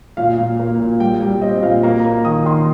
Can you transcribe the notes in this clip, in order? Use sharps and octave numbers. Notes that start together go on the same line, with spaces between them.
A#2 F5
A#2
A#3
A#2
G3 G5
G3
C4 D#5
A#2 F5
A#3 A#5
A#3
D#3 D#6
D#3 C6